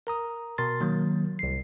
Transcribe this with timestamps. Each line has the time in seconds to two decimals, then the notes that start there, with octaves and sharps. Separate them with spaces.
0.07 A#4 A#5 D#6
0.58 B2 A#4 C6 A6
0.81 D#3 F#3 A#3
1.39 C2 C7